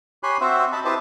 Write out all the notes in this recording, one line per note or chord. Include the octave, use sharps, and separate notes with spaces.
G4 C#5 G#5 B5 C6 F#6
C4 F#4 C5 E5
D#5 A5 B5
E4 G4 B4 C5 D#5 A5